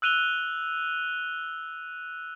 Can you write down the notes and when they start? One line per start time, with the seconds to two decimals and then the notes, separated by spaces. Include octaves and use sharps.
0.02 E6 F#6 D#7 F7 G7